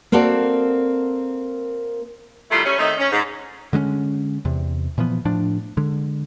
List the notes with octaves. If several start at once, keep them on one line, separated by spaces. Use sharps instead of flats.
A#3 C4 F#4 A4 A#4 D5
D#3 G3 A3 E4 F4
G3 A3 C#4
D#3 A3 C4 D#4
C#4
G#2
D3 G#3 B3 C#4
E2 C3
A#2 E3 F3 B3
A2 F3 D4
D3 G#3